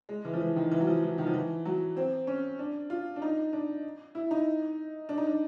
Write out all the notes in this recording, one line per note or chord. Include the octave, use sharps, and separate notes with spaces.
G#3
E3
F3
E3
D#3
E3
F#3
F3
E3
D#3
F3
E3
F#3
C4
C#4
D4
F4
D4
D#4
D4
E4
D#4
D4
D#4
D4